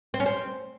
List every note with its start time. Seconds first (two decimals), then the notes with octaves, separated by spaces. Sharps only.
0.14 C4
0.20 C#4
0.26 C4